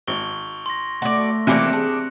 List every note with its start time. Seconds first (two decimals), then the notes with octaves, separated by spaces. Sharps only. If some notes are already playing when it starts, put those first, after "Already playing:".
0.07 G#1 C#6 G7
0.66 C6 A#6
1.02 A3 F#4 D5 A#6
1.47 C3 E3 A#3 D4 F6 F#6 C#7
1.73 D4 G#4